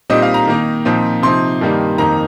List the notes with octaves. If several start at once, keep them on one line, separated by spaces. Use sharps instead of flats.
A#2 G3 C4 D#4 D#5
F5
A#5
D#3 A#3 D#4
A#2 F3 C4 D#4
C3 F3 D#4 C6
G2 D#3 G3 A#3 D#4
F2 D#3 A#3 D#4 A#5